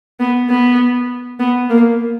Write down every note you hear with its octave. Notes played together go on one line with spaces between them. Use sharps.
B3
B3
B3
A#3